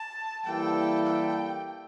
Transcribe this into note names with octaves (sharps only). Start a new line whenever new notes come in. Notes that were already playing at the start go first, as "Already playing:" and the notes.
Already playing: A5
E3 G3 A#3 E4 A4 G5
G5